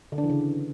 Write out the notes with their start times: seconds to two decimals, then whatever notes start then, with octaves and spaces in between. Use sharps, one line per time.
0.12 D3
0.18 D4
0.24 E3
0.30 C#3